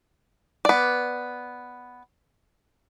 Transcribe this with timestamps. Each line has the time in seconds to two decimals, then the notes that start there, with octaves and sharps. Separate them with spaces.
0.65 B3 D5